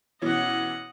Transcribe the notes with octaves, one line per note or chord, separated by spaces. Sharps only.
B2 E3 C#4 D#5 F#5